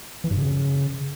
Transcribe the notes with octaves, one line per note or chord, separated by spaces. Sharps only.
E3
G2
C#3